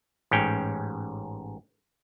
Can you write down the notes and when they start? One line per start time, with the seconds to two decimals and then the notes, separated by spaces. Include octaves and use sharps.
0.31 A1 G#2 C#4 G5